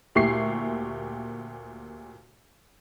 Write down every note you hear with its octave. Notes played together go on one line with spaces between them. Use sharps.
D2 A#2 E4 G4 C#6 C7